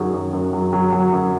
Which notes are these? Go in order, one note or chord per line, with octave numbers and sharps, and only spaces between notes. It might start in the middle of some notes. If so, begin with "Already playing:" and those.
Already playing: F#2 D#3 F#3 F#4 G#4
F#2
F#2
F#3
F#3
F#3
F#2